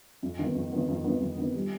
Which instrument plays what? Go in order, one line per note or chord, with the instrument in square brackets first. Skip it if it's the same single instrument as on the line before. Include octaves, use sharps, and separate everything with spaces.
[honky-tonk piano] F2
D#3 B3
F2
D#3 B3
F2
D#3 B3
F2
D#3 B3
G3